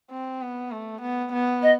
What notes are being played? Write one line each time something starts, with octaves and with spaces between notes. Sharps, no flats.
C4
B3
A3
B3
B3
D#5